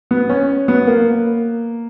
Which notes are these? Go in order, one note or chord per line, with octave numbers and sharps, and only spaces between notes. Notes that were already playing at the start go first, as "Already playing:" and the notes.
B3
C#4
B3
A#3